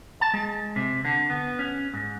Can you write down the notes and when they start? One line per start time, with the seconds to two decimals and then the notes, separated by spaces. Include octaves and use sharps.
0.21 A5
0.34 G#3
0.76 C3
1.05 D3
1.30 B3
1.59 C#4
1.94 G#2